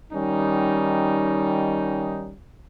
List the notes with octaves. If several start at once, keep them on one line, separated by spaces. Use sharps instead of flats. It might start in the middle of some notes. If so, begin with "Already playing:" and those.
D#3 G3 C#4 D#4